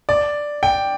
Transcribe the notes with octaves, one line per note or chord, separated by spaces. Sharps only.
D5
G5